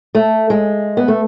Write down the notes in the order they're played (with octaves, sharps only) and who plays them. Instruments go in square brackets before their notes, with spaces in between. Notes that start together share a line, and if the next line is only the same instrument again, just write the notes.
[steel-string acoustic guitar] A3
G#3
B3
A3